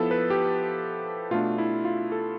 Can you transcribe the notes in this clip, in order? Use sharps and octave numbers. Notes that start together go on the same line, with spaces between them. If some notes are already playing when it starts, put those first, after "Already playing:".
Already playing: F3 B3 E4 A4
B4
G4
B2 A3 D4 F4
E4
F4
A4